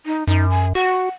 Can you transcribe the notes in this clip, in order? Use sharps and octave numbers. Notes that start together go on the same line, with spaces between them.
D#4
F#2 D#4
G#5
F#4 F#5